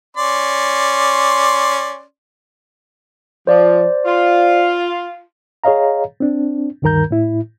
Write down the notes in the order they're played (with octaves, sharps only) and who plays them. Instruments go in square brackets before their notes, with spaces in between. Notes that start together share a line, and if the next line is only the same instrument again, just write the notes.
[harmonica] C#4 D5 C6
[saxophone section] F3 [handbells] C5 D5
[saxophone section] F4
[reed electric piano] G#4 C#5 D#5 F5 A#5
C4 D4
D2 G2 D#3 A#4 A#5 G6
A2 E4